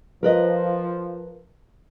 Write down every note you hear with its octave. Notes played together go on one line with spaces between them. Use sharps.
F3 A#4 B4 D#5